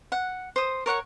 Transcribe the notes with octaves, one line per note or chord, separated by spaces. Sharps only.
F#5
C5 D#6
A#4 C#5 F#5 C#6